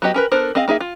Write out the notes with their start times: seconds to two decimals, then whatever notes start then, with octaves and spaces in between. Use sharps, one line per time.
0.02 F#3 B3 F#4 G4 D#5
0.14 C#4 A#4 B4
0.32 B3 D4 A4 A#4 C5
0.55 C4 G#4 D#5 F5
0.68 A#3 D#4 G#4 E5
0.80 F4